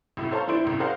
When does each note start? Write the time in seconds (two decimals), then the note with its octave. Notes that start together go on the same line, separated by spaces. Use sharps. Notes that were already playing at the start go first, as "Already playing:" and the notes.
0.17 C2 A2 E4
0.31 A4 C5 C#5 F5 A5 A#5
0.48 E3 D4 E4 C5 D7
0.64 C2 F#2 A2
0.80 G#4 A#4 C5 D5 F5 F#5